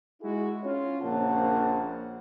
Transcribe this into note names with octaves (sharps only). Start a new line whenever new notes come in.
G#3 D#4 E4 F#4 G#4
C#4 F4 C#5
A#1 C#3 A#3 C4 F#5 A5